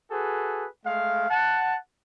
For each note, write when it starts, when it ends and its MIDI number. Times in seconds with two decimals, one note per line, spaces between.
0.11 0.66 66
0.11 0.66 68
0.11 0.66 69
0.11 0.66 71
0.85 1.27 56
0.85 1.27 57
0.85 1.27 77
1.29 1.77 78
1.29 1.77 81